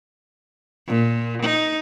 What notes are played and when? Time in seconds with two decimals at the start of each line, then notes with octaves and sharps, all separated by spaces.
0.87 A#2
1.42 D#4